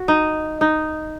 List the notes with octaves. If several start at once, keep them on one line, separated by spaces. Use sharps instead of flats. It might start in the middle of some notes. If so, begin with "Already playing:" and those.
Already playing: F#4
D#4
D#4